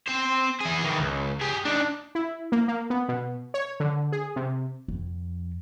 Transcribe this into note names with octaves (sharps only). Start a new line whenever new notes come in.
C4 C5
E3 G#4
D#3 E3
C#2
G4 G#4
D4 D#4
E4
A#3
A#3
B3
B2
C#5
D3
G#4
C3
F2